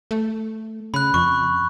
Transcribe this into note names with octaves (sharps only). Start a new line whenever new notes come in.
A3
C#3 B5 F#6
F2 C#6